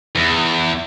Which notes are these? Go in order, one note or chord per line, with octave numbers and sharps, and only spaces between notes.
E2